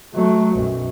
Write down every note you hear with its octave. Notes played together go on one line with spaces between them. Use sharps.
F#3 A3
B1 F#2